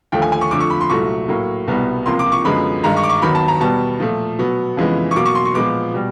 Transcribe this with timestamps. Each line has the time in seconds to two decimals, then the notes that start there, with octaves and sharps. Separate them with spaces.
0.12 D#2 D3 F3 A3 G5
0.22 G#5
0.32 G#5
0.41 C#6
0.51 F2 D3 F3 A3 D6
0.60 C#6
0.70 B5
0.81 C6
0.90 C2 A#2 F#3 A3 C#6
1.28 A2 F#3 A#3
1.67 C2 B2 G3 B3
2.06 C#2 C3 F3 A#3 C6
2.19 D6
2.32 C#6
2.45 F#2 D3 F3 G#3 B3 B5
2.83 G2 D#3 G#3 A#5
2.97 C#6
3.03 D6
3.09 C#6
3.22 D#2 D#3 F#3 B3 B5
3.35 A5
3.48 A#5
3.60 B2 G3 B3 A5
4.00 A#2 F3 A3
4.39 B2 F#3 B3
4.77 F2 C#3 E3 G#3 B3
5.11 C#6
5.16 B2 F#3 A#3 D6
5.26 C#6
5.35 C6
5.45 C#6
5.54 A#2 F3 G#3 B3 D6
5.94 B2 G3